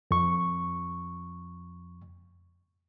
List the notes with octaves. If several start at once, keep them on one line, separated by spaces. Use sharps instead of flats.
F2 C#6